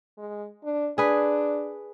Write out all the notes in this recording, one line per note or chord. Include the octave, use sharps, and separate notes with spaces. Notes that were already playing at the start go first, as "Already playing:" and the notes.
G#3
D4
D4 G#4 B4